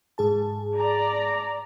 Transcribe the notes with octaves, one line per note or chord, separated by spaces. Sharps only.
G#2 G#4 A5
D5 A#5